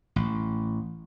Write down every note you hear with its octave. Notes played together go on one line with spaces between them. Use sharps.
A1